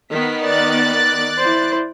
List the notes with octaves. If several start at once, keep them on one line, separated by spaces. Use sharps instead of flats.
D#3 B3 B6
D5 F#6 A6
E4 C5